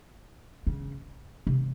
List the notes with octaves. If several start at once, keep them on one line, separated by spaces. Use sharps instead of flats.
C#3
C3